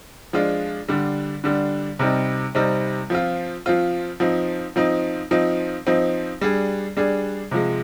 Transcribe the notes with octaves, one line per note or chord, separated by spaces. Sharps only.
F3 G#3 D4 F4
D3 G3 D4
D3 G3 D4
C3 G3 C4 D#4
C3 G3 C4 D#4
F3 C4 F4
F3 C4 F4
F3 C4 D#4
F3 C4 D#4
F3 C4 D#4
F3 C4 D#4
G3 D4 G#4
G3 D4 G#4
C3 F3 G#3